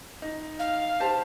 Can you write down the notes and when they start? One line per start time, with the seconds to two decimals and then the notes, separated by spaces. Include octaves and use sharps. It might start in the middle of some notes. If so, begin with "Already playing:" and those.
0.22 D#4
0.59 F5
1.00 G4 C5 A5